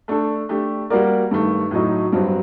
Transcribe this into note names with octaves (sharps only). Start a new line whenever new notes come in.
A3 D4 A4
A3 D4 G4
G3 A#3 F#4 A#4 D5
G2 D#3 A3
A2 F#3 A3 D#4
G2 F#3 C4